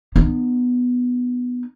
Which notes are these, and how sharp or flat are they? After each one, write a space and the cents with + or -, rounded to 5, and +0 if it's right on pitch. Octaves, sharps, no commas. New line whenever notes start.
B3 +0 D#4 -45